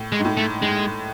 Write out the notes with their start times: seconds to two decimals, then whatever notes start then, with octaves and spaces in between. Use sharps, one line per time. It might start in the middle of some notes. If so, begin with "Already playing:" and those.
Already playing: A2
0.12 G#3
0.19 G#2
0.25 A2
0.37 A3
0.61 G#2 G#3